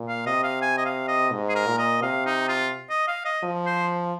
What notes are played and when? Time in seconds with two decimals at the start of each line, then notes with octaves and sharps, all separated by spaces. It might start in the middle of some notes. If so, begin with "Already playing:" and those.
Already playing: A#2
0.08 F5
0.26 C3 D#5
0.43 F5
0.62 G#5
0.78 D#5
0.85 F5
1.08 D#5
1.32 G#2
1.49 G#4
1.56 A#4
1.67 A#2
1.78 D#5
2.02 C3 F5
2.26 D#4
2.48 F4
2.90 D#5
3.08 F5
3.25 D#5
3.43 F3
3.66 C5